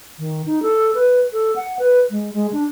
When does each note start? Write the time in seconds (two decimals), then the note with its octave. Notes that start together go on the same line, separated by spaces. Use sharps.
0.19 D#3
0.46 D#4
0.63 A4
0.95 B4
1.33 A4
1.56 F#5
1.79 B4
2.10 G#3
2.33 G#3
2.53 D4